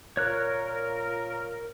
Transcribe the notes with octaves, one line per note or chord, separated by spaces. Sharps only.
A#2 A#4 C#5 F#6